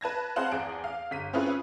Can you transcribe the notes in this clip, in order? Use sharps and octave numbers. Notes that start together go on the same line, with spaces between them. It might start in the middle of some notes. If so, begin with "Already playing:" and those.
B4 A5 G#6 A#6
C4 G#4 C5 F5 F#5 A5
E2 G#4 D7
F5
G1 B6 D#7
C4 C#4 E4 F4 G#4 B4